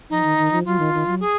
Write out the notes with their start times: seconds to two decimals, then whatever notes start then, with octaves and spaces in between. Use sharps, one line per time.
0.10 F3 D#4
0.24 D#3
0.38 D#3
0.51 F3
0.65 F#3 F4
0.79 D#3
0.93 D#3
1.06 F#3
1.20 G#4